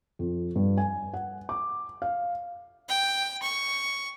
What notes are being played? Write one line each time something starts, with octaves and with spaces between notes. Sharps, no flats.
F2
G2
G#5
F#5
D6
F5
G5
C#6